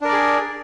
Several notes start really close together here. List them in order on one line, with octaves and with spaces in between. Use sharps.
D4 A#4 D5 G#4